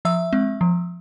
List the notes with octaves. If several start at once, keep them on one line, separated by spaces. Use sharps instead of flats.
F3 E5 E6
G#3 C4
F3